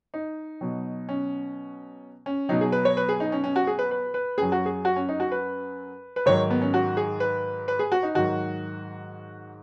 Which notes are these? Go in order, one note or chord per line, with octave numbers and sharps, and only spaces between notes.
D#4
B2 F#3
C#4
C#4
B2 F#3 D#4
G#4
B4
C#5
B4
G#4
D#4
C#4
C#4
F#4
G#4
B4
B4
B4
F#2 F#3 G#4
F#4
G#4
F#4
C#4
D#4
F#4
B4
B4
G#2 D#3 F#3 C#5
B3
C#4
F#4
G#4
B4
B4
G#4
F#4
D#4
G#2 D#3 F#3 F#4